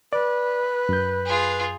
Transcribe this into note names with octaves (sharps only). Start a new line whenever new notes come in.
B4 D5
F#2 G6
F4 G#4